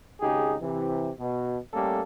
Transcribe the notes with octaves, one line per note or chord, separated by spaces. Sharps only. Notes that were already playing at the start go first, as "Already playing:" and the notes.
G#1 C#3 D#4 G4 G#4
C3 E3
B2
G3 A3 A#3 C#4 A4